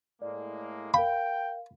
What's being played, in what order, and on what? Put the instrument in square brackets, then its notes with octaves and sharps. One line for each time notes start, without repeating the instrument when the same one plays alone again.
[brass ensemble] A2 G#3 A#3 [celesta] D5
[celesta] A#4 F5 [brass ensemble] G5 [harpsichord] B5